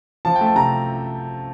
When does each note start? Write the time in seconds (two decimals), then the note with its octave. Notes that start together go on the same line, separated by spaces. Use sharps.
0.25 F3 A5
0.36 G5
0.41 A3
0.46 A5
0.56 C3 A#5